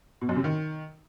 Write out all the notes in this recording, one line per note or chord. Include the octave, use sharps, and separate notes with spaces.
B2
F#2
C3
D#3